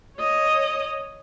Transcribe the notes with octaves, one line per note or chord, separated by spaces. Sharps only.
C#5 D#5